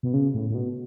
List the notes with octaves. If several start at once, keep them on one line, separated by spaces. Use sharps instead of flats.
B2
C#3
A2
A2
B2